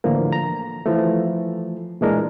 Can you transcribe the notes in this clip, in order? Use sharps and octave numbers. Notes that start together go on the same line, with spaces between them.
A2 D3 E3 F3 A#3
A#5
E3 F3 A3
A#2 E3 G#3 D4 A#4